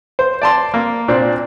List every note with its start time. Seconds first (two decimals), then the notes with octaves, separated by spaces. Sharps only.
0.19 C5
0.42 D5 A5 C6
0.74 A#3
1.08 A#2 C4 D4